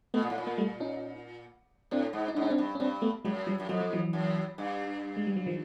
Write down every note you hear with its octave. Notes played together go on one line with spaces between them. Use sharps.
B2 A3 B3
A#2
A2
A#2
A#3
G3 A3
C#4 D#4
A2 C4 D4
G#2
D#4
G#2 D4
C#4 D#4
C4 D4
G2
C#4
G2 C4 D4
A3 B3
F#2 F#3 G#3
F3 G3
F#2
F2 F#3
F3
E3 F#3
F#2
G2
G#3
G3
F#3
D#3 F3